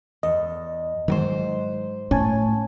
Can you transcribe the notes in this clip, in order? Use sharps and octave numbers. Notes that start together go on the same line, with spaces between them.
E2 D#5
G#2 D#3 F#3 G#3 C5
A2 C#4 C#5 G#5 A5